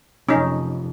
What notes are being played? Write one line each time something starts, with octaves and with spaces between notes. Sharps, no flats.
F1 F2 C#4 D#4